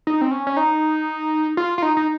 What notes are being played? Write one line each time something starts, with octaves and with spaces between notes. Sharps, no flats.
D#4
C4
C#4
C#4
D#4
F4
F4
D#4
D#4